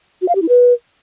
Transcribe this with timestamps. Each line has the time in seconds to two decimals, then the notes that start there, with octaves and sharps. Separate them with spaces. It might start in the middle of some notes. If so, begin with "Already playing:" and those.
0.22 F#4
0.28 F5
0.35 G4
0.42 E4
0.49 B4